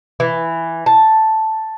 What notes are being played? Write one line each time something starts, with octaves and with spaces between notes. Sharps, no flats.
E3
A5